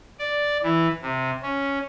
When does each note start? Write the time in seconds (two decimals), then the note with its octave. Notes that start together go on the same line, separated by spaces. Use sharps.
0.19 D5
0.63 E3
1.02 C3
1.42 C#4